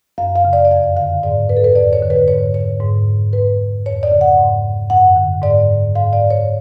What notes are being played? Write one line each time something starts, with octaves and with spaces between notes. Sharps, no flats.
F#2 F5
F5
C#3
D5
D5
F2 F5
D3 F5
G#2 D5
B4
A4
B4
F2 D5
C#5
D3
B4
G#2 C#5
C#5
G#2
G#2 B4
F2 C#5
D5
C#3
F#5
G#2
F#2 F#5
D3
G#2 D5
G#2 F5
D5
C#5